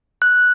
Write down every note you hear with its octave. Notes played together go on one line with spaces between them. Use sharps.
F#6